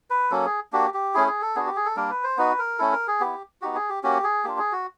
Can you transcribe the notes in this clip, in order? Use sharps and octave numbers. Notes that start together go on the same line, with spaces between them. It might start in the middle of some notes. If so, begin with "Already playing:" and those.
B4
F#3 A#3 C#4 A4
G#4
A#3 D4 F#4 G4
G4
A3 C#4 E4 G#4
G#4
A4
B3 D4 F#4 G#4
G4
G#4
A4
G3 A#3 D4 A#4
B4
C5
B3 D#4 F#4 B4
A#4
A3 C#4 E4 A4
A#4
G#4
B3 E4 G4
B3 D#4 F#4 G4
G#4
G4
A#3 C#4 F#4 G4
G#4
A#3 D4 F4 G4
G#4
F#4